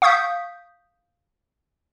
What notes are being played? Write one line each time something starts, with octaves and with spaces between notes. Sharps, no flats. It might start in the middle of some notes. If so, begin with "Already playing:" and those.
F5 C#6 D#6 G6 B6